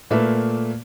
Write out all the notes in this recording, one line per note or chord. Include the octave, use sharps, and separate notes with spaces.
A#2 A3 A#3 B4 E5